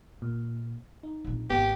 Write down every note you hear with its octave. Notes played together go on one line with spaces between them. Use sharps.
A#2
D#4
A#1 C4
G#1 B3 G4